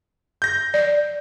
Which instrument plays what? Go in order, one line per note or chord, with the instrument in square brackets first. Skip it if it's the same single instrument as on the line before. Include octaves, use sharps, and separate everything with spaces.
[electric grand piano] G6 A#6
[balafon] D5